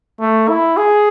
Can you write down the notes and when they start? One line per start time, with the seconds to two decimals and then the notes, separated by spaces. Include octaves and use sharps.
0.21 A3
0.49 E4
0.77 G#4